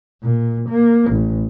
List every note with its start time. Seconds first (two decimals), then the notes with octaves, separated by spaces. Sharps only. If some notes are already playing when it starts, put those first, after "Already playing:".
0.23 A#2
0.69 A#3
1.11 A1